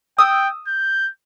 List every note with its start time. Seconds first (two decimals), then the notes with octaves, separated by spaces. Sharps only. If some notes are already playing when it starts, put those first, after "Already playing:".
0.19 G5 D#6 E6
0.67 G6